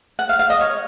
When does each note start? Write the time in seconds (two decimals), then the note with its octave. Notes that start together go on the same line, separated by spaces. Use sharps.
0.19 F#5
0.29 F5
0.39 F5
0.50 D#5
0.61 C#5